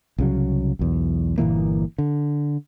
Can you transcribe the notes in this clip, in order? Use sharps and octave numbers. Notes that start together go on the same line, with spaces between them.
C2 C#3 F#3
B1 E2
G1 A#2 E3 A#3
D3